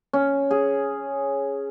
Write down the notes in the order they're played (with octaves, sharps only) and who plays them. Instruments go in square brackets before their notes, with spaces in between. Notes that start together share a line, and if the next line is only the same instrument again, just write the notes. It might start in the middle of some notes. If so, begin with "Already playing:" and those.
[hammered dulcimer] C#4
G#4